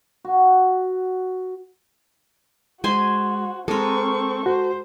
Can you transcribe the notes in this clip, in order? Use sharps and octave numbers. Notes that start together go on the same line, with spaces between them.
F#4
G#3 F#4 C5 G#5 C6
G#3 C4 A4 A#4 C#6
F#4 C5